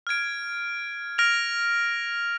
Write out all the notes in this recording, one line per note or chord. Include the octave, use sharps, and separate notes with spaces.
F6 G#6 D7
F6 A#6 D7 F7